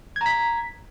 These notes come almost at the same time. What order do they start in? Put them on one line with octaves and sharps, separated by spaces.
G#6 A#5 B6